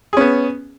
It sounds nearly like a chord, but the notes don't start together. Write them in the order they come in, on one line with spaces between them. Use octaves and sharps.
G#4 C#4 B3